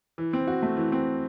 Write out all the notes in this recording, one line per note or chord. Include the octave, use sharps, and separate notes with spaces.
E3
C4
F#4
A3
E3
C4